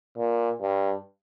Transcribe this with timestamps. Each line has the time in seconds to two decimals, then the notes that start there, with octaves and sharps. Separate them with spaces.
0.18 A#2
0.62 G2